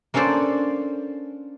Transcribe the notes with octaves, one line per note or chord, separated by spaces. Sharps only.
A#3 C#4 D4 A4 C5 D5